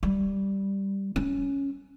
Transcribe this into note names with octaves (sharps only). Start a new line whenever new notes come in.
G3
C#4